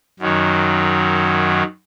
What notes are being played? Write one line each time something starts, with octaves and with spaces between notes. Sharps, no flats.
F#2 D#3 F#3